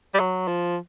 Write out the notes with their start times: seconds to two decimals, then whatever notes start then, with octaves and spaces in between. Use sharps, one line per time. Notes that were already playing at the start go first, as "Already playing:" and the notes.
0.14 G3
0.19 F#3
0.48 F3